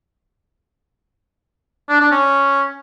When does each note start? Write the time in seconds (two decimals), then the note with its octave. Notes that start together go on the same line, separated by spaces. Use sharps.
1.89 D4
2.00 D4
2.12 C#4